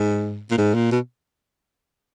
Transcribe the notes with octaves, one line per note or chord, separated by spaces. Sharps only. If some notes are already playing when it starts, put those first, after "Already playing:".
Already playing: G#2
A#2
G#2
A#2
B2